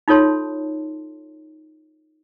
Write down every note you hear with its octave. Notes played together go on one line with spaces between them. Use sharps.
D#4 F4 A4 C#5 A5 C6